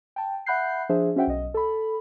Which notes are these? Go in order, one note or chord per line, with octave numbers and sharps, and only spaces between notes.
G5 A5
E5 F#5 B5 F#6 G6 C7
F3 D4 G#4 C5 E5
C#4 F#4 C5 E5 F#5 G5
B1 D#5
A4 B5